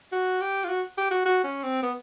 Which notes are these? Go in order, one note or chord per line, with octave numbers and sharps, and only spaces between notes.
F#4
G4
F4
F#4
G4
F#4
F#4
C#4
C4
B3